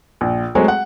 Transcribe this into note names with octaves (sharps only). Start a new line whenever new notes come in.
A#1
F#3 G#3 A3 C4 F#4 G#4
F#5